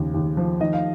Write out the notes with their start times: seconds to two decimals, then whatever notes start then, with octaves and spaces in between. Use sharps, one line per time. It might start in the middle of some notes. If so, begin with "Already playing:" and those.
Already playing: D#2 C#3 F3
0.14 D#2
0.37 F3
0.60 D#3 D#5
0.73 F5